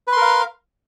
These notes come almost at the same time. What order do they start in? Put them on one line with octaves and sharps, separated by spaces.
B4 C6 A#4 F5